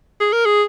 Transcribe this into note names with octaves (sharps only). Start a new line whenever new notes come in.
G#4
A#4
G#4